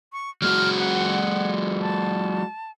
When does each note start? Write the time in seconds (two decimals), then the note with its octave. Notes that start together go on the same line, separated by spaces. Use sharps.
0.13 C#6
0.42 F#3 G#3 F#4 F6
0.79 F#5
1.81 A5